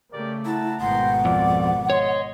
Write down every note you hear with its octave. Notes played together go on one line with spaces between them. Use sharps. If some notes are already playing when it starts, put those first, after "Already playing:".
C#3 A3 G4 A#4 D5
E4 F#5 A5 A#5
G#1 B2 F#5 G5 A#5 C6
F2 D5
C#5 D#5 C6